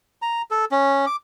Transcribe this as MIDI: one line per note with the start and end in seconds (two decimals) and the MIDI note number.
0.22 0.42 82
0.51 0.65 69
0.72 1.05 61
1.07 1.16 86